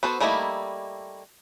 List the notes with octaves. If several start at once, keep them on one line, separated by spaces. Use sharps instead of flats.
B3 F#4 A4 C5
G3 A3 A#3 D#4 E4